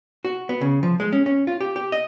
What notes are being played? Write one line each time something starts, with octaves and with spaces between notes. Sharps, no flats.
F#4
B3
C#3
F3
G#3
C#4
C#4
F4
G4
G4
D#5